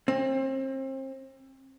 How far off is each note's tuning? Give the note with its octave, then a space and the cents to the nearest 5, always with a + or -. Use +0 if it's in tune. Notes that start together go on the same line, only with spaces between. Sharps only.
C4 +35